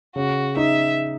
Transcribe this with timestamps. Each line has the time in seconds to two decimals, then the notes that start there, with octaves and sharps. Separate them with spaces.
0.16 C#3 F#4
0.57 D#4 E5